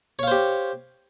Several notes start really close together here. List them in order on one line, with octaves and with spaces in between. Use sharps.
C#5 F5 C5 G4